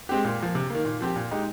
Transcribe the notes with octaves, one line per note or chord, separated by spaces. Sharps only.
G#3 C4 G4
A#2
F3 A#3
C3
D#3 A#3
A#2
F3 C4 G4
A#2
G#3 D#4 G4